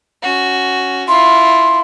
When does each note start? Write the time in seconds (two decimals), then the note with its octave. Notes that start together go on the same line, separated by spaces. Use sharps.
0.23 C#4 F#4
1.08 E4 F4 C6